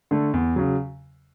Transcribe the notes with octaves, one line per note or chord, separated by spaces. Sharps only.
D3 A3
E2
C#3 F#3